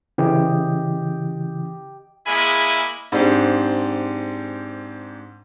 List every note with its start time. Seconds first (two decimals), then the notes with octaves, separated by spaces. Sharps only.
0.18 C#3 E3 G4 D#5
2.27 G#3 A#3 E4 G#4 G#5 B5
3.12 G#2 C4 D4 G4